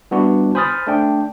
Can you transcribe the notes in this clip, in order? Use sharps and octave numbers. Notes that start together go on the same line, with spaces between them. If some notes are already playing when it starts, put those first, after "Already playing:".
G3 B3 D4 E4 F#4
C5 G#5 B5 D#6 F6 A6
A3 D4 G5